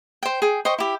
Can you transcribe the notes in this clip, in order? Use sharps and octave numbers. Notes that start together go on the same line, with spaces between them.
C5 G5
G#4 G5
C5 D#5 G5 C#6
E4 G4